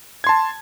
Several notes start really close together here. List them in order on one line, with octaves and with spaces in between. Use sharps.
G#6 C6 A5